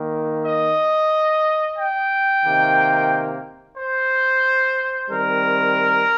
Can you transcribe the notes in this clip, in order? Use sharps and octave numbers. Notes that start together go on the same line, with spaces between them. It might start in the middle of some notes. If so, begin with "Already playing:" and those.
Already playing: D#3 A#3
D#5
G5
C3 D#3 A#3
C5
D#3 G3 C4 A#4